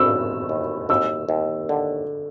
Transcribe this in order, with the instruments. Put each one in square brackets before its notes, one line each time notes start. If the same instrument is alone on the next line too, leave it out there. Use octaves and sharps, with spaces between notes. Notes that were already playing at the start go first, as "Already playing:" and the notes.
Already playing: [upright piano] E6
[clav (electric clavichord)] D#2
D#2
[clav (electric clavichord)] D#2 [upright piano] E6
[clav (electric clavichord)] D#2
D3